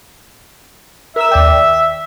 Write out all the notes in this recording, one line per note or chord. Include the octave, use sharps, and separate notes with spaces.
A#4 E5 E6
D#2 D5 G5